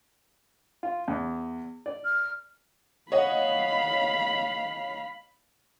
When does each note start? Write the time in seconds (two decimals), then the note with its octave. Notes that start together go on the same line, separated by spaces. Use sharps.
0.83 F4
1.08 E2
1.86 D5
2.05 F6
3.12 C#5 D#5 F5 F#5 B5